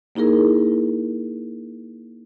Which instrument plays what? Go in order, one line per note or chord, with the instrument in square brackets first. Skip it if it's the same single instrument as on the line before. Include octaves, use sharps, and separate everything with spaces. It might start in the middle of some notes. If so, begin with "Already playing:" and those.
[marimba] A#3 D#4 E4 G#4 A#4